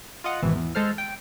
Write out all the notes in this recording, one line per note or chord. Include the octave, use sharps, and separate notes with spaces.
F4 D#5 F#5
G#1 B2 E3
E2
G#3 A4 C5 F6
G5